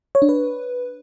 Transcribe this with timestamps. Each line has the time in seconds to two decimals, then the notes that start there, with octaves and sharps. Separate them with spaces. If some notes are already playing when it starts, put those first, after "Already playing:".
0.15 C#5
0.22 D4
0.29 B4